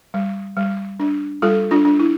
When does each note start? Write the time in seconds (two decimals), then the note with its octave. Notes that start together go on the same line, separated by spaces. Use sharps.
0.14 G3
0.57 G3
1.00 D4
1.42 G3 F4 A4
1.71 D4 F4
1.85 D4
2.00 E4